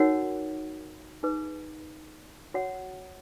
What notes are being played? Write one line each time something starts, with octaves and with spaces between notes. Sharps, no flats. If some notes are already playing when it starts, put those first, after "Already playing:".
Already playing: D#4 F#4 A#4 C#5 F#5
D#4 G#4 B4
F#4 C#5 F#5